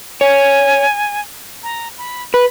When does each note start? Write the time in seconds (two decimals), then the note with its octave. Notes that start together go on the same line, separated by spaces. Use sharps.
0.21 C#5 G#5
1.63 A#5
1.98 B5
2.34 B4 B5